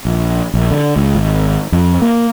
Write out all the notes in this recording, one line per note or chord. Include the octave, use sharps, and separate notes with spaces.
A#1
A#1
D3
C#2
G#1
F2
A#3